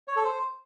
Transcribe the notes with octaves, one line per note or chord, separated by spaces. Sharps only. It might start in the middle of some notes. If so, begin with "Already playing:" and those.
C#5
A4
C5